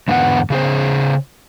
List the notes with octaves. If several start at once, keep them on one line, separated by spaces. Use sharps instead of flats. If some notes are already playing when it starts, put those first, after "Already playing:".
E2 G#2 D3 B3 F4 F#5
C#3 G#4 C5